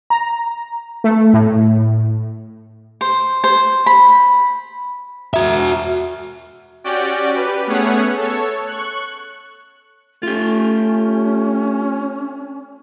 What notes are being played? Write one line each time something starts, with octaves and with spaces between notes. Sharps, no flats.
A#5
A3
A2
C5
C5
B5
F#4 E5
C#4 F#4 G4 D5 G5
G4 B4
A3 B3 C#4 G#4 C#5 F#5
A4 C#5
C#6 F#6
A3 C#4 F4 G4